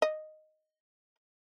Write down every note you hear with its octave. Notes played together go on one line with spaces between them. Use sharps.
D#5